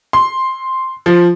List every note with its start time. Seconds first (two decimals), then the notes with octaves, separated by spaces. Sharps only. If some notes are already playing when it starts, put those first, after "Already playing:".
0.13 C6
1.06 F3